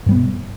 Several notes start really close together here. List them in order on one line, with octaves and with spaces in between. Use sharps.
G2 G3 B3 B2